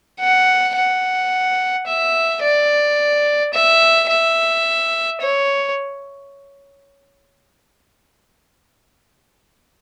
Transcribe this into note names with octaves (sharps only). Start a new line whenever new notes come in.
F#5
F#5
E5
D5
E5
E5
C#5